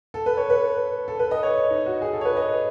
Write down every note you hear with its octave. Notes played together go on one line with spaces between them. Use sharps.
A4
B4
C#5
B4
A4
B4
D#5
C#5
D#4
F#4
G#4
A4
C#5
B4
D#5